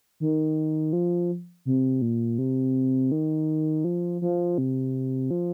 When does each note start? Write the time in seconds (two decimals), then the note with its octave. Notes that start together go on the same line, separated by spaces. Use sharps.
0.20 D#3
0.93 F3
1.65 C3
2.02 A#2
2.38 C3
3.12 D#3
3.85 F3
4.22 F3
4.58 C3
5.31 F3